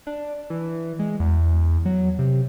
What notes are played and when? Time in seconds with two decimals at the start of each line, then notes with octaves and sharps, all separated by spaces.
0.07 D4
0.50 E3
0.99 G#3
1.20 E2
1.85 F#3
2.19 C3